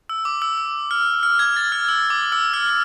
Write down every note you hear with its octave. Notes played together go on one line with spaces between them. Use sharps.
E6
D6
E6
E6
F6
F6
G#6
A6
F6
E6
D6
E6
F6
F6